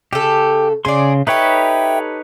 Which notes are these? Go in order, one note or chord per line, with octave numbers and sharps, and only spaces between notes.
C#3 G4 A4
C#3 G#4 D5 C6
D#4 G4 A4 B4 C#5 E5 G5